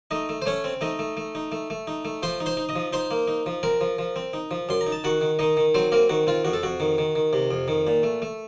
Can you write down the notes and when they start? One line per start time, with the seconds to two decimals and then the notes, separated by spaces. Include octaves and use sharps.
0.11 A3 D#4 D#5
0.29 A3
0.42 C5
0.46 A3 C#4 C#5
0.64 C4
0.81 A3 D#4 D#5
0.99 A3
1.17 A3
1.35 D#4
1.52 A3
1.70 A3
1.87 D#4
2.05 A3
2.23 F3 C5 C6
2.40 D#4
2.46 C5 C6
2.57 D#4
2.69 D#5 D#6
2.76 F3
2.93 D#4 C5 C6
3.11 A#3
3.28 D#4
3.46 F3
3.63 C4 A#4 A#5
3.81 F3
3.98 F3
4.16 C4
4.33 D#4
4.51 F3
4.69 F#2 C6
4.81 A#5
4.87 D#4
4.92 A5
5.04 D#3 F#4 F#5
5.21 D#3
5.39 D#3 D#4 D#5
5.57 D#3
5.74 F#3 C4 C5
5.92 A#3 C4 A#4
6.09 D#3 F#4
6.27 C4 F4
6.45 F2 F#4
6.53 A4
6.63 F2 F#4
6.80 D#3
6.98 D#3
7.15 D#3
7.33 C3
7.51 F2
7.68 D#3
7.87 A#2
8.03 A3
8.22 A3